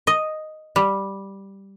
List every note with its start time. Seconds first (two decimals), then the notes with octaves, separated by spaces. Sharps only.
0.07 D#5
0.76 G3